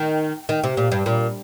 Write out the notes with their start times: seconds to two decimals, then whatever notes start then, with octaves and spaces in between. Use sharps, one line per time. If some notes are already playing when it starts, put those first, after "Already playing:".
Already playing: D#3
0.49 D#3
0.63 C3
0.77 A#2
0.92 G2
1.06 A#2